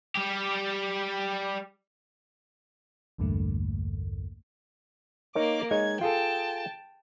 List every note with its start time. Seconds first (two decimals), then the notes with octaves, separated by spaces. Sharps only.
0.15 G3 G4
3.18 B1 E2 G2 D3 A3 A#3
5.35 A#3 D#4 A#4 C#5 D6
5.71 G#3 D#4 C#5 G#6
6.01 F4 G#4 A4 G5 A5